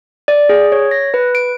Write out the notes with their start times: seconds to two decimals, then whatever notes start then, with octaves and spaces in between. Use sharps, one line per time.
0.28 D5
0.49 G#4
0.72 C#5
0.91 A#6
1.14 B4
1.35 D7